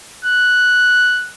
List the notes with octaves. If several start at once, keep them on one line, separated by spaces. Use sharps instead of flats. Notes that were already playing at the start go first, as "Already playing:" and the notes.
F#6